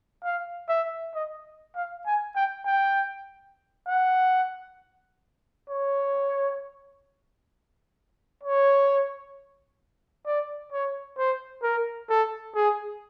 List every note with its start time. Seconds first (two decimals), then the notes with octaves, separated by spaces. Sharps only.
0.24 F5
0.68 E5
1.15 D#5
1.76 F5
2.06 G#5
2.36 G5
2.66 G5
3.88 F#5
5.70 C#5
8.43 C#5
10.26 D5
10.72 C#5
11.18 C5
11.63 A#4
12.09 A4
12.55 G#4